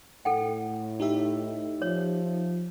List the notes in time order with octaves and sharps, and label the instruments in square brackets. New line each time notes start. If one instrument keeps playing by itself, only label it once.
[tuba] A2 [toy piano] A4 F#5 G5
[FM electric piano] D#4 G4 E5
[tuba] F3 [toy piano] C#5